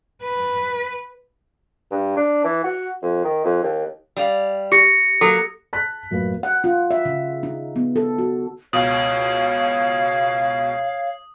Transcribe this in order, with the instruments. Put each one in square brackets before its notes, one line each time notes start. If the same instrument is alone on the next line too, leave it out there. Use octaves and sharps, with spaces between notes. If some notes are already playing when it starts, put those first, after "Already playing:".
[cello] B4
[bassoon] G2
D4
E3
F#4
F2
D#3
F2
D#2
[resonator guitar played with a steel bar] G3 F5
[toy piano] G4 [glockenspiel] A#6 C#7
[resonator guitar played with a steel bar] F#3 A#3 [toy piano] A4
[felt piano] A5 F#6 B6
A1 F#2 A#3 B4
[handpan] F#5
F4
E5
C#3
D#4
B3
A4
F#4
[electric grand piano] C#2 B2 [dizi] C#5 [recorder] F5 [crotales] D#6